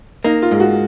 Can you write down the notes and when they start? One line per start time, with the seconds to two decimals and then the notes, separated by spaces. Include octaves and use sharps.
0.24 A#3 D#4
0.42 F4
0.51 G#2
0.60 F#4